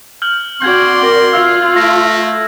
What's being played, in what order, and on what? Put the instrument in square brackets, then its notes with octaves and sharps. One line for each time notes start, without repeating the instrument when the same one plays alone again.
[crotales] F6 G6 F#7
[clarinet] C4 [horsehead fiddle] F#4 D5 [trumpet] C6 [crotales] G6 G#6
[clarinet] A#4
[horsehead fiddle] F4 [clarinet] F5 [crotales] E6
[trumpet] A3 [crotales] A#6